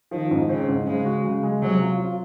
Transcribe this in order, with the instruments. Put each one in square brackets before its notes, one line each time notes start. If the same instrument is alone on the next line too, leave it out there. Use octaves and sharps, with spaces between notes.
[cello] D#3 [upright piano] F3
[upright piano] G#2
[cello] C#3 [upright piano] C4
[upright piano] G#2
[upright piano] C#3 [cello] G#3
[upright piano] F#4
C#3
G#3
[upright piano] C3 [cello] F#3
[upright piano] F4
F4